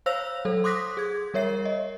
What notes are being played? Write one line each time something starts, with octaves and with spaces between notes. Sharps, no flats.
C5 C#5 F5 E6 A#6 F7
F#3 A4 C5
C6 D6 D#6 F#6 A#6 B6
G#4 G#6
G3 A#4 C#5 E5 C7
D#5